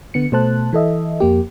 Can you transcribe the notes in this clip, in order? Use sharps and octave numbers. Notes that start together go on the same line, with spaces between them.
D3 B3 C#7
B2 A3 C5 A5 F#6
E3 A4 D#5 E5
F2 A#3 G4